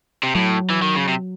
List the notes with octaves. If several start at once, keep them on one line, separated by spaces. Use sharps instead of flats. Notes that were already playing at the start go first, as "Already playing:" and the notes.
C3
A2 F#3
E3
D#3
C#3
C3